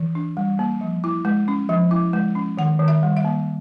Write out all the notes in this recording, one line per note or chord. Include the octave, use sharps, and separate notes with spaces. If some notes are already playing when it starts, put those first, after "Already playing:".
Already playing: E3
D4
G3
A#3
F3
E4
G#3
C#4
F3
E4
G#3
C#4
D#3 F#5
D#3
E5
G3
E5
A#3